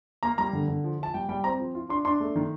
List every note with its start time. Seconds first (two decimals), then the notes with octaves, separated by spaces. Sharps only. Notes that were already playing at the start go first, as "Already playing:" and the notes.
0.23 A#3 A#5
0.38 G3 A#5
0.53 D3
0.68 D3
0.84 F3
0.99 F3 A5
1.14 G3 G5
1.29 G3 G5
1.44 C4 A#5
1.60 F3
1.75 F4
1.89 D4 C6
2.05 D4 C6
2.20 A3
2.36 D#3